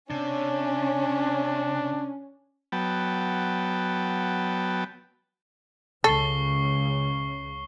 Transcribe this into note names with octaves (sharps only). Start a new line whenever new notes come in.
C3 C#4 D4
F#3 B3 G5 A5
C#2 C#3 A4 C#6 C7 G7